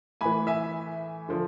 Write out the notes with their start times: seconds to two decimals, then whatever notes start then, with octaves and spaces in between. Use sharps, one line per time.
0.21 A2 E3 G#5 B5
0.47 E5 G#5
1.29 D3 F3